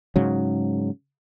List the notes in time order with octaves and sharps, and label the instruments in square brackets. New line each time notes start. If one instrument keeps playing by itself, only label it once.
[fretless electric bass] G#2 C#3 F#3